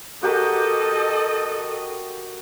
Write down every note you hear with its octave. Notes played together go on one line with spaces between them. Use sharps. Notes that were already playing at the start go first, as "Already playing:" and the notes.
F#4 G4 A4 A#4 D#5